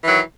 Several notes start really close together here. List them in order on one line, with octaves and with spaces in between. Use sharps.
E3 D#3 F#3